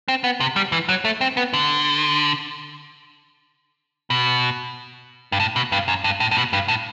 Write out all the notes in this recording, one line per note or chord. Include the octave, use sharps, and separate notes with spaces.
C4
B3
C3
G3
E3
F#3
A3
C4
B3
D3
B2
G2
A2
B2
G2
F#2
G2
A2
A2
B2
G2
A2